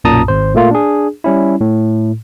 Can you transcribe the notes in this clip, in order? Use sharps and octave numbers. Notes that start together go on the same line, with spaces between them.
B1 F#2 A#2 A5 A#5 D#6
G#1 C5
A#2 A3 A#3 F4
D4 G#4
G3 C#4 E4
A2